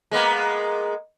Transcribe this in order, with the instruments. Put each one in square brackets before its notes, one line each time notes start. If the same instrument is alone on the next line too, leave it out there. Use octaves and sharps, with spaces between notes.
[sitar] G#3 A#3 B3